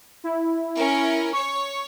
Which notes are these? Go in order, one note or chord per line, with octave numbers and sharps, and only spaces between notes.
E4
C#4 A#4
C#5 C#6